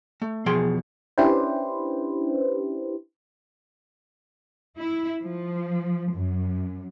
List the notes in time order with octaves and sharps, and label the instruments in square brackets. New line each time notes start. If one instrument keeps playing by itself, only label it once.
[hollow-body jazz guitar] A3
E2 B2 F3 G#4 G5 C6
[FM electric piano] C#4 D4 E4 G4 B4 C5
[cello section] E4
F3
F#2